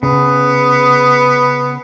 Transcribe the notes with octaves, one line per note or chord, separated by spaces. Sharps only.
C#3 B3